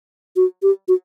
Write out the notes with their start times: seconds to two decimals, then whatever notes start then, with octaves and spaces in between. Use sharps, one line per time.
0.36 F#4
0.63 G4
0.88 F#4